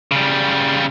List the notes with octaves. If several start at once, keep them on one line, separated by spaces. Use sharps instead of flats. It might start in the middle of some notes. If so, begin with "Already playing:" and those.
C#3 G3